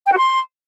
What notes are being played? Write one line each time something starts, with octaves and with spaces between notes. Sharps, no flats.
G5
F#4
C6